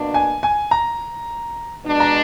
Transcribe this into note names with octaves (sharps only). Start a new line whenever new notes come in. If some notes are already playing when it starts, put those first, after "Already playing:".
Already playing: B2 A#3 D4
G#5
G#5
A#5
B2 G#3 D4
A#5